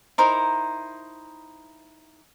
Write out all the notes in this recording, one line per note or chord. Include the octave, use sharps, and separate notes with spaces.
D#4 E4 A#4 C5